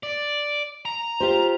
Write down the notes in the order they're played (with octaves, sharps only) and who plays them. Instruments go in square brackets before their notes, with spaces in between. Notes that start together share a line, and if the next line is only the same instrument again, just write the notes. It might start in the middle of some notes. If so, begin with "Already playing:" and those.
[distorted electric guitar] D5
A#5
[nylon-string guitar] F4 G4 C5